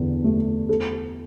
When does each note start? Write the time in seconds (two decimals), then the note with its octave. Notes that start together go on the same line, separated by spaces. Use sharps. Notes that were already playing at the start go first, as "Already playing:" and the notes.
Already playing: E2 D3
0.24 A3
0.69 A4